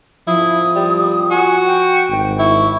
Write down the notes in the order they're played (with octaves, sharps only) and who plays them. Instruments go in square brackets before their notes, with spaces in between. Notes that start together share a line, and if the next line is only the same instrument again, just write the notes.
[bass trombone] F3 [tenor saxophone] E4 [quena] D#6
[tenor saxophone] G3
[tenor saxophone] F#4 [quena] G#5
[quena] G5
[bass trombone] G#1
[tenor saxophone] E4 [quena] C#6